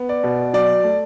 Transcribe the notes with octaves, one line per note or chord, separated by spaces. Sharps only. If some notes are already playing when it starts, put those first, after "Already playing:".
Already playing: B3
D5
B2
F#3 D5
A3